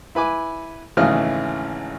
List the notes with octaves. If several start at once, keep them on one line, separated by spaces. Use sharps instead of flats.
E4 B4 G#5 D6
G#1 C#3 E3 A3 D#5 F6